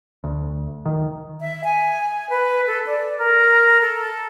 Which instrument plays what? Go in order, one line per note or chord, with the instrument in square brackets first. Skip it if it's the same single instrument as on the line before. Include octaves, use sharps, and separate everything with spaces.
[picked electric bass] D2
D#3
[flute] E5
G#5
B4
A4
D5
A#4
A4